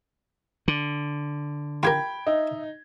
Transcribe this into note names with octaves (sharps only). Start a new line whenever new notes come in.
D3
F4 G4 A#4 G5 B5 G#6
D#4 D#5 E5